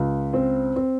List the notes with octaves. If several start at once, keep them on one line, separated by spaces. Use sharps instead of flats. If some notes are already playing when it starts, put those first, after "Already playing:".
Already playing: C#2
C4
C4